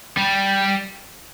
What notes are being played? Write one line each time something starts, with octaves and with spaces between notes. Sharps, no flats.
G3